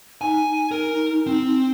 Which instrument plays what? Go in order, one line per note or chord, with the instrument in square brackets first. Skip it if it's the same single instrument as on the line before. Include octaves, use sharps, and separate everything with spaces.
[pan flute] D#4 [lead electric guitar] G#5
[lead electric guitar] A#4
C4